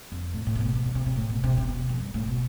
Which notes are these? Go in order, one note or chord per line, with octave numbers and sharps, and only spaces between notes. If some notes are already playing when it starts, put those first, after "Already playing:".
F2
A2
A2
C3
B2
C3
D3
C3
C3
A2
B2
C3
C3
B2
E2
F2
G2
A2
B2